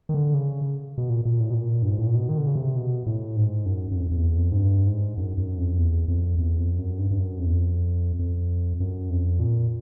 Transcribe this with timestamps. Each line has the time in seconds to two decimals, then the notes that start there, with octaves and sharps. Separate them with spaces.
0.09 D#3
0.14 D3
0.34 C#3
0.98 B2
1.10 A#2
1.25 A#2
1.40 A2
1.50 B2
1.54 A#2
1.83 G2
1.91 G#2
1.99 A2
2.07 A#2
2.15 B2
2.29 D#3
2.37 D3
2.47 C#3
2.55 C3
2.76 B2
3.06 A2
3.36 G#2
3.66 F#2
3.91 F#2
3.96 F2
4.11 F2
4.16 E2
4.37 F2
4.52 G#2
4.57 G2
4.87 G#2
5.17 F#2
5.38 F#2
5.58 F2
5.78 E2
6.08 F2
6.38 E2
6.58 F2
6.79 F#2
6.99 G2
7.11 G2
7.19 F#2
7.39 F2
7.46 E2
7.53 F2
8.19 F2
8.80 F#2
9.10 F2
9.40 A#2